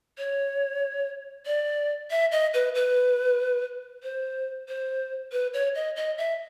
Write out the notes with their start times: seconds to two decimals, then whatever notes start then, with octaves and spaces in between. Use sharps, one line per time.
0.18 C#5
1.46 D5
2.11 E5
2.32 D#5
2.54 B4
2.75 B4
4.03 C5
4.68 C5
5.32 B4
5.54 C#5
5.75 D#5
5.96 D#5
6.18 E5